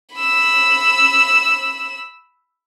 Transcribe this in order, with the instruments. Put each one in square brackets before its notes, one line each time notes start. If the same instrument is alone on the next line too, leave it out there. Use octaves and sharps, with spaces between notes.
[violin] B5 E6